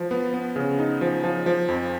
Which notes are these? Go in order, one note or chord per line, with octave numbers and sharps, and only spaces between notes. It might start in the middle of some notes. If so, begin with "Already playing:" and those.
Already playing: F3
B3
B3
C#3
D#4
F3
F3
F3
F2